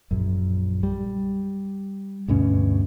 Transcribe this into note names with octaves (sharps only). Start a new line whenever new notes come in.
A#1 F#2
G3
D2 G2 B2 C#4